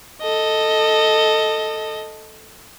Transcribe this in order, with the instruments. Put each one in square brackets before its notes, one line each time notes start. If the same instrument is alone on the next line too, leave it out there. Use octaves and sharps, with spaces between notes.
[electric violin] A4 D#5